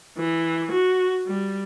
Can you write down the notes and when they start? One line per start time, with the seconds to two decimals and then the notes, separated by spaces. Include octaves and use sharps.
0.18 E3
0.72 F#4
1.27 G3